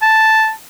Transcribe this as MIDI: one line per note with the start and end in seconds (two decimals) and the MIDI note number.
0.02 0.51 81